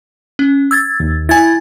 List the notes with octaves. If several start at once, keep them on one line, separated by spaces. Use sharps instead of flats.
C#4
E6 G#6 A6
D#2
E4 G#5 G#6 A6